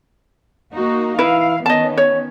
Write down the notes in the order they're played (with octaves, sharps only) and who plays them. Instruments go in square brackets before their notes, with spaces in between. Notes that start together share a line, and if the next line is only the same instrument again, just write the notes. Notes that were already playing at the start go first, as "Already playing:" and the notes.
[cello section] A#3 D#4 F#4
[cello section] E3 F5 [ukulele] E4 B4
[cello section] D#3 B3 C#4 [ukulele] D#5 A5
[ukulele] C#5